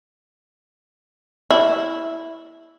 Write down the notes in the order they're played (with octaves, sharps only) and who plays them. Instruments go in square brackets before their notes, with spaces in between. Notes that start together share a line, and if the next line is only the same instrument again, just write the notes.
[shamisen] E4